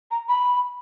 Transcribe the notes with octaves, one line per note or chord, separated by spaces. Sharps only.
A#5
B5